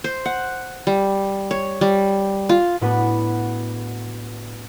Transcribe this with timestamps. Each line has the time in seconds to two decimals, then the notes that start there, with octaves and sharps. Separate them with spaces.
0.04 C5
0.25 F#5
0.87 G3
1.51 C#5
1.81 G3
2.49 F4
2.81 A2 B3 D4 F#4 B4